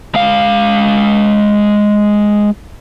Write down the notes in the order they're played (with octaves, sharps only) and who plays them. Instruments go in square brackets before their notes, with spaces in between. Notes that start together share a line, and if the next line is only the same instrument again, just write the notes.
[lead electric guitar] G#3 F5